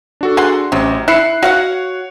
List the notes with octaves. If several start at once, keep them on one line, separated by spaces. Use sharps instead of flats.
D4 F#4 A4
G#4 F#5 C6
A1 C3 F#3 C#4
E4 F#6 C7 C#7
F#4 C#5 F5 F#5